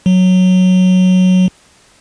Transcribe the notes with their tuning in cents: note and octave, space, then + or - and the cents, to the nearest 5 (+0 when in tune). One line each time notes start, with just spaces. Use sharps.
F#3 -5